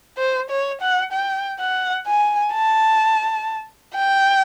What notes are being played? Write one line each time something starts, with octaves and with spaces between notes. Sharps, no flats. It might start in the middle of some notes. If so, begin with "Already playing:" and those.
C5
C#5
F#5
G5
F#5
G#5
A5
G5